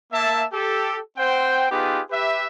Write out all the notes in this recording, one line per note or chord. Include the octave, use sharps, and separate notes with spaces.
A#3 E5 A5
G4 A4
C4 C5 F#5 G5
B3 D#4 F4 G4 G#4 B4
G4 B4 E5